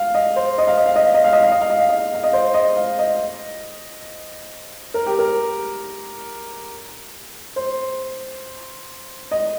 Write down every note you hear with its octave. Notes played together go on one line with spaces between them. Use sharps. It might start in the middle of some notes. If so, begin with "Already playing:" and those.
Already playing: F5
D#5
C5
D#5
F5
D#5
F5
D#5
F5
D#5
F5
D#5
F5
D#5
F5
D#5
F5
D#5
F5
D#5
C5
D#5
F5
D#5
A#4
G4
A#4
C5
D#5